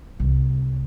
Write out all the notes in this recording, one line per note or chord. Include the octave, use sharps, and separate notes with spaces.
C2